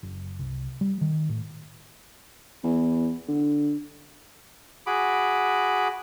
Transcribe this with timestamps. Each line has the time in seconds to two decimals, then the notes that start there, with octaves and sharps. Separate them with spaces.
0.03 F#1
0.39 C2
0.81 G3
1.01 D#3
1.29 A2
2.64 E2
3.28 D3
4.87 F#4 G#4 B5 D6